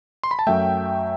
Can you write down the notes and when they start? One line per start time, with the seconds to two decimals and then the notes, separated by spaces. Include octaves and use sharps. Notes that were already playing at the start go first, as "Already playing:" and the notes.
0.24 C6
0.31 B5
0.39 A5
0.47 F#2 F#3 A3 E5 G5